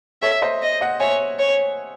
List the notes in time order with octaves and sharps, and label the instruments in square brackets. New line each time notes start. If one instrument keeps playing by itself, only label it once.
[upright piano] A4 C#5 [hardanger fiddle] E5
[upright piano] C5 D#5
[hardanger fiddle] D#5
[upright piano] D#5 F#5
[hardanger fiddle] C#5 [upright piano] E5 G#5
[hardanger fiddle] C#5